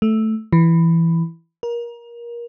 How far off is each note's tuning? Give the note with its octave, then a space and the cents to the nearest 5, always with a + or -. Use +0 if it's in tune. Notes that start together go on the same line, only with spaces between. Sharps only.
A3 -5
E3 +10
A#4 +25